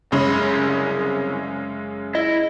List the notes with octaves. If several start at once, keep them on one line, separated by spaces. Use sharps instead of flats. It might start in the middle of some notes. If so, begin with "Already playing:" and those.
C2 F#2 C#3 G#3 C#4 B5
E4 D#5